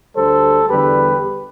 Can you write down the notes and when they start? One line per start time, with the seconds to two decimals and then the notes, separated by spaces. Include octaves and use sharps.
0.16 D2 D3 G3 A4 C5
0.69 E2 D3 G3 G4 B4